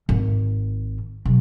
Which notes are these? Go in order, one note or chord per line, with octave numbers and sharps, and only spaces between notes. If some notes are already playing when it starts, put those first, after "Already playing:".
G#1
B1